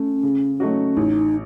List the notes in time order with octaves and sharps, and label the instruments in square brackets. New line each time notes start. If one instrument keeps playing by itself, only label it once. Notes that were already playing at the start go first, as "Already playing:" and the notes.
Already playing: [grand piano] A3 [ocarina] C#4
[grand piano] C#3
F#3 A3 D#4 F#4
[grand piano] A1 [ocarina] D#4